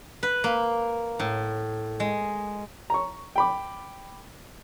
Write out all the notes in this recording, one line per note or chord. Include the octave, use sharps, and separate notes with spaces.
B4
A#3
A2
G#3
A#5 C#6
G5 B5 D6